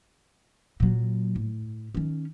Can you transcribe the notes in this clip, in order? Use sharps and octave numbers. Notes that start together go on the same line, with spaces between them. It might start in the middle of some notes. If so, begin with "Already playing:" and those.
A#2 F#3
A2
D#3 C#4